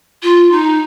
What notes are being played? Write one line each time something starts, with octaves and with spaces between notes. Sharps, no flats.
F4
D#4